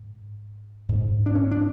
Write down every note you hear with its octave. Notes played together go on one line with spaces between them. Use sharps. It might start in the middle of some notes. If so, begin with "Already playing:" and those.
Already playing: G#2
G#2
D4
C#4
D4